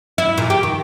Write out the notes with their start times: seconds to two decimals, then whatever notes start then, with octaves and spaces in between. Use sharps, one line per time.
0.18 E4
0.38 A#2
0.50 G4
0.63 D#3